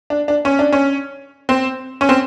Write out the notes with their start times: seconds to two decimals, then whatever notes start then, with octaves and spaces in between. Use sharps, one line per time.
0.10 D4
0.28 D4
0.45 C#4
0.59 D4
0.73 C#4
1.49 C4
2.01 C#4
2.09 C4